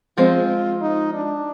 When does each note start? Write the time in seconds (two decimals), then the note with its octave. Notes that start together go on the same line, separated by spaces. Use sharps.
0.18 F3 G#3 C4 F4
0.81 D#4
1.14 D4